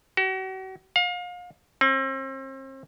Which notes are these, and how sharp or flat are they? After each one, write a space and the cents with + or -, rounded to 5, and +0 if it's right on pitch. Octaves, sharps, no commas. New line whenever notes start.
F#4 +40
F5 +35
C4 +40